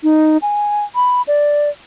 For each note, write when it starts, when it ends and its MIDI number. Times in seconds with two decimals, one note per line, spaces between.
0.03 0.37 63
0.42 0.84 80
0.95 1.22 83
1.28 1.70 74